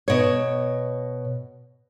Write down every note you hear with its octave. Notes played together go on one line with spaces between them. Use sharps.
B2 C#5